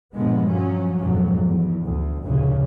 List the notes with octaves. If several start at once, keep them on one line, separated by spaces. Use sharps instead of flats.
G2 A#2 D3 F3 G#3 B3
F3 F#3 C#4
B1 F2 G#2 F3 F#3
E2
D2
F1 D2 A#2 C#3